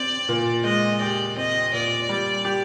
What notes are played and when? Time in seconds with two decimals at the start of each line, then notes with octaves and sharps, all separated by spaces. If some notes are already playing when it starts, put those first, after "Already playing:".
Already playing: C4 G4 D5
0.29 A#2
0.64 G#3 D#5
1.01 G4 D5
1.36 C4 D#5
1.73 A#2 D5
2.09 G3
2.45 G4